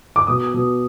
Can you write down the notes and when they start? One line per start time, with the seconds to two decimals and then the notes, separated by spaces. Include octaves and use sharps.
0.16 D6
0.27 B2 D#6
0.54 B2